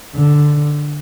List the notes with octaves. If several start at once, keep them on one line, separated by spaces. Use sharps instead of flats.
D3